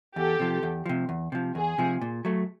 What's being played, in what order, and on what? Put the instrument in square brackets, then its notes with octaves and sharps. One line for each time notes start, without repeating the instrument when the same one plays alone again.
[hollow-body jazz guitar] E2 [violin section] G4 A4
[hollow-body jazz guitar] C3 F3
E2
C3 F3
E2
C3 F3
[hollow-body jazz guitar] E2 [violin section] G#4
[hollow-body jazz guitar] C3 F3
A#2
F#3 A3